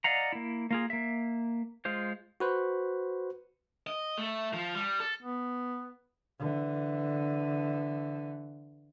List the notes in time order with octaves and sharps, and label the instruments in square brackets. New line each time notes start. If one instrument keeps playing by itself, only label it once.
[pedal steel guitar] D5 D#5 F5 F#5 A#5
A#3 E4
A#3 F4 G#4
A#3 E5
G#3 F4 C5
[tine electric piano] F#4 B4 C5
[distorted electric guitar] D#5
A3
F3
G3
A4
[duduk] B3
[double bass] D3 E3